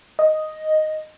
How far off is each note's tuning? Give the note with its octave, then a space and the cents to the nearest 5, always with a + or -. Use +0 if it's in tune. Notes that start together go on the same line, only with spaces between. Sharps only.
D#5 +0